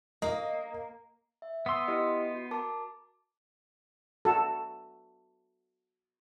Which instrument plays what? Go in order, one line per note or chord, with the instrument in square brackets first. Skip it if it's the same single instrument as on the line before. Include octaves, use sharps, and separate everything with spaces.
[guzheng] A#3 [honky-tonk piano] D#5
[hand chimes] E5
[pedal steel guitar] B3 C6 [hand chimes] D#6 E6
[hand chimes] E4 G4 D#5
F#4
A#4 A5 D6
[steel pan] F#4 A4